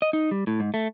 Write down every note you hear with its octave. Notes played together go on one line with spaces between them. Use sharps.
D#5
D#4
G3
A2
G#2
A3